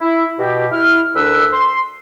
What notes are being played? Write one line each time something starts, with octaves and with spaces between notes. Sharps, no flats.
E4
B2 G4
E4 F6
D2 D4 A#4 B4 E6
C6